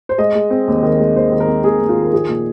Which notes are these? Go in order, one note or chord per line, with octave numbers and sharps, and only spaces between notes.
C5
G#3 D#5
G#3
C4
D#2
D#3
G#3
D#2 C5
D#3
A#4
C4
D#2 G#4
D#2
F4
D#3
A#4
F3 G#4
A#2